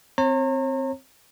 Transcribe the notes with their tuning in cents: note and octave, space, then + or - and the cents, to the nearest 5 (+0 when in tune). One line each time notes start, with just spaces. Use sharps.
C4 +0 C#5 -40 A#5 -35